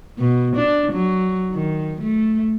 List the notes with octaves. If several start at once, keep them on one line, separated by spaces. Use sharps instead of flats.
B2
D4
F#3
D#3
A3